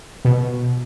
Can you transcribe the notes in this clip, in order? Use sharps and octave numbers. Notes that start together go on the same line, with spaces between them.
B2